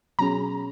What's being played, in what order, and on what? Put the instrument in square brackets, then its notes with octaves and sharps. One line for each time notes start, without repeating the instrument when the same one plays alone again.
[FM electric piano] B2 F#3 C#4 G#4 [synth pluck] A#5